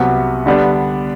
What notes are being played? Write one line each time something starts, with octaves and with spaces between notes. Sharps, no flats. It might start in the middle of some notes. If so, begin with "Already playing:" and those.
Already playing: C2 C3 F#3 B3 F#4
D3 G3 B3 D4